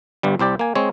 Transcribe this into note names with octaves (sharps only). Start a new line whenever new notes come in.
G1 G2 G3
C2 C4 G4 D5
A#3 G#5
G#3 C4 C#5